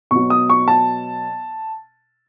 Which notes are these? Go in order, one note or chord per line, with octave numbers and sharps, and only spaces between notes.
B2 F#3 C#6
D#6
C#6
A5